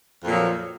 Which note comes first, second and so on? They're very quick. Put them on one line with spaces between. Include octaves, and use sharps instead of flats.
F2 A#2 F#3 F3